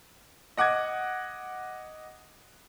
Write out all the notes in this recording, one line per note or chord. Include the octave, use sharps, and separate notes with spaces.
D#5 F#5 D6 F#6 G#6